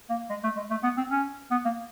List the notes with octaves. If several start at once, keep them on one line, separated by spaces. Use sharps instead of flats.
A#3
G#3
A3
G#3
A3
B3
C4
C#4
B3
A#3